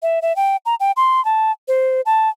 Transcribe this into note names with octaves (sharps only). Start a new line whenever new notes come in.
E5
E5
G5
A#5
G5
C6
A5
C5
A5